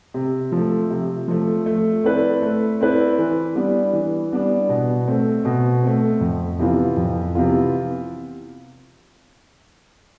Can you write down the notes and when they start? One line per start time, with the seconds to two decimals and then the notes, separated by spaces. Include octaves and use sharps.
0.14 C3
0.52 F3
0.57 A3
0.90 C3
1.28 F3 A3
1.66 A3
2.04 C4 E4 B4 D5
2.42 A3
2.81 C4 E4 B4 D5
3.19 E3
3.56 G3 B3 D4
3.93 E3
4.32 G3 B3 D4
4.69 B2
5.07 A3 C4
5.45 B2
5.83 A3 C4
6.21 F2
6.59 C3 E3 B3 F4
6.97 F2
7.35 C3 E3 B3 F4